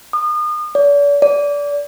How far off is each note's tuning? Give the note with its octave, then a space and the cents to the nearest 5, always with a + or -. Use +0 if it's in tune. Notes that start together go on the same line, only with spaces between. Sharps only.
D#6 -35
D5 -40
D5 -25